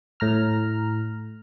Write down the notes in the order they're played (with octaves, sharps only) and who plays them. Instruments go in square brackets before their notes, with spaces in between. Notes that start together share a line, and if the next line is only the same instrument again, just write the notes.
[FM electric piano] A2 A#5 F6